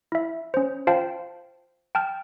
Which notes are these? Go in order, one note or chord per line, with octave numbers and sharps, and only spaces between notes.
E4 E5
C#4 C5
F4 C5 F5 G5 A5
G5 A5 F6